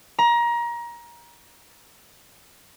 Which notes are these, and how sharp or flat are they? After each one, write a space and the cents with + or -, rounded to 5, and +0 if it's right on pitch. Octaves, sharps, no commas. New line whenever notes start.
A#5 +25